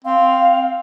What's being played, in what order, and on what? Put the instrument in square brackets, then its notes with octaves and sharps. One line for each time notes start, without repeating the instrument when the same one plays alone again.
[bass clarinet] C4 [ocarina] F5